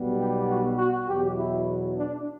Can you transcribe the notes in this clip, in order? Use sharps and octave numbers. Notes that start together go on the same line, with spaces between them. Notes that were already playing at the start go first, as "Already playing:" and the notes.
Already playing: B1 B2 G3 B3
G4
F#4
F#4
E2 B2 F#3 G4
E4
D4